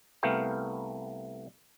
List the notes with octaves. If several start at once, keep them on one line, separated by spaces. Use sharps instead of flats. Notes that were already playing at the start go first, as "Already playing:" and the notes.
C2 A3 B3 A#4 F5 G5